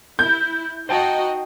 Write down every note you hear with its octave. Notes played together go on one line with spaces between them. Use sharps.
E4 G6
D#4 F#4 C5 D#5 G5 A5